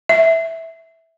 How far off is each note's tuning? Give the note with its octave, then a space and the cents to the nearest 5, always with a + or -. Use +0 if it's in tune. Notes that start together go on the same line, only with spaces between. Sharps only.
E5 -10